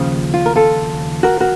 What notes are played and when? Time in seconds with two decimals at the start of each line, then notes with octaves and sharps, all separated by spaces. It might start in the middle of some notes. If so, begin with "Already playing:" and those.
Already playing: D#2 C#3 F3
0.34 F4
0.46 A#4
0.56 F4 A4
1.23 F#4 A#4
1.40 F#4 A#4